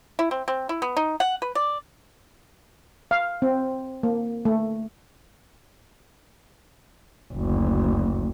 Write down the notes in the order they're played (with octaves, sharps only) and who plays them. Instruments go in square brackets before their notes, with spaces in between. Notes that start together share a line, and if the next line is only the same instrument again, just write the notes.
[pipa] E4
C4
C4
E4
B3
D#4
F#5
B4
D5
[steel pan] F5
C4
A#3
A3
[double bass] F#1 D2